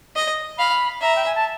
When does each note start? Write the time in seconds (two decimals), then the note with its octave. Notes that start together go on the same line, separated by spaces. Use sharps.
0.16 D#5
0.58 F5 B5
1.01 E5 A#5
1.16 G5
1.26 G#5
1.35 A5